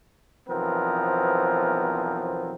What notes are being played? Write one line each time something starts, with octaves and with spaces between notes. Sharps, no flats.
B1 E3 F3 B3 C4 A#4